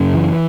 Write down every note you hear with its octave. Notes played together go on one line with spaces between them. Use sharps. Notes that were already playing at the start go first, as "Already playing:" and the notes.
Already playing: F#2 C#3
E3